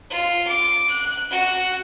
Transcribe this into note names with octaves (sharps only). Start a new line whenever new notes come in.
F4
D6
F#6
F#4